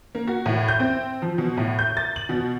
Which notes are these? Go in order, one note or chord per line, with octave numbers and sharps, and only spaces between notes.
A#3
F#4
A2
G6
C4
F3
B2
A2
G6
A6
F#7
B2